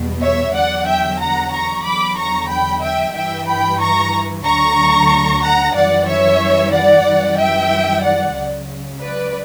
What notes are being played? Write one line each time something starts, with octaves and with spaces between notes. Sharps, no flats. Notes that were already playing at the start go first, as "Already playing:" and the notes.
Already playing: E2 B2 G3
C#5 E5
E2 D3 F#3 D5 F#5
E5 G5
F#5 A#5
A#5 C#6
E2 D3 F#3 B5 D6
A#5 C#6
G5 B5
E5 G5
G2 E3 G3 E5 G5
G5 B5
A#5 C#6
D2 D3 F#3 A#5 C#6
F#5 A#5
F#2 E3 G3 D5 F#5
C#5 E5
D5 F#5
F#2 E3 G3
E5 G5
D5 F#5
C#2 C#3 F#3
B4 D5